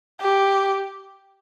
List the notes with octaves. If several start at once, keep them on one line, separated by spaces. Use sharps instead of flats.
G4